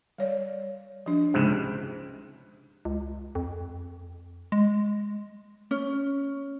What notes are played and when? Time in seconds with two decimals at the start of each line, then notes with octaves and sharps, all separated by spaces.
0.18 G3 C#5 D5
1.06 F3 D4
1.34 C#2 G#2 C3
2.85 C#2
3.35 F2
4.52 G#3
5.71 C#4